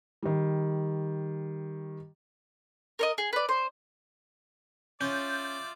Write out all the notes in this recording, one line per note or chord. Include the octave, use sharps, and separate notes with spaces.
D#3 G3
A#4 C#5 D#5
G#4
B4 D5
C5
C#4 F4 D5 E5 G6